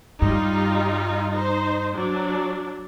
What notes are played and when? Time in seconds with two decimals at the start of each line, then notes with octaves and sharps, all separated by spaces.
0.22 G2 G3 D#4 F4
1.33 D#4 C5
1.92 F#3 D4